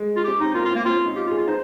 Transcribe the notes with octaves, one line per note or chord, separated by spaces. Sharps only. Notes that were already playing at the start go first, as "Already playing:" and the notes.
Already playing: G#3
F4
C#4 G4
C4 D#4
A#3 F4
F4
C4
A#3
C4 F4
C#4
D#4
F4 G4
F4
G#4
F4
D#4 C5